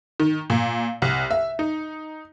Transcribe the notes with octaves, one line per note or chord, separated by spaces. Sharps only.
D#3
A#2
C2
E5
D#4